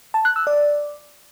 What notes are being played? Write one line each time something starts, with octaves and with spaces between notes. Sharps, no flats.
A5
F#6
E6
D5